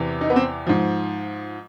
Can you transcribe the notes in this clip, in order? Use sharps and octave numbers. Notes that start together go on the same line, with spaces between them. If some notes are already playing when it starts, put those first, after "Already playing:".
Already playing: E2 C3 E3
D#4
B3
C4
G#2 F3